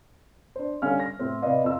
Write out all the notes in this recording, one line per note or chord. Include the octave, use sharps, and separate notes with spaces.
D4 C5
D3 G3 C#4 F5 F6
A#6
A2 C4
C3 B4 D5 D#5 F5
F2 F4 E6